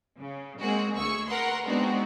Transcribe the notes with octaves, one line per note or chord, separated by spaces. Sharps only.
C#3
G#3 A#3 C4 F#4 G#4
D2 G#4 C#6 E6
A#4 B4 F#5 C6
G#3 B3 C4 D4 D#4 F#4